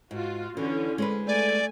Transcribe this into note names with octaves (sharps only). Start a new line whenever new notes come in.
G#2 F4 F#4
D3 E3 C#4
G#3 C4 B4
A3 D5 G#5